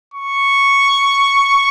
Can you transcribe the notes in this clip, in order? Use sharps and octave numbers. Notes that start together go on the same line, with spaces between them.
C#6